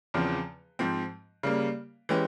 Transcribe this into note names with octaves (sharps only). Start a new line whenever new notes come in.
E2 C#3 F3 C4
G#2 F3 C4
C#3 G3 A#3
E3 G#3 C#4 G4